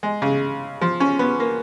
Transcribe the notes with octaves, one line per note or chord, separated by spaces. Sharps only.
G#3
C#3
F3
C#4
B3
A#3